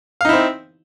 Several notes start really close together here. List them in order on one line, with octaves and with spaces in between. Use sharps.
F5 D#4 E4 C4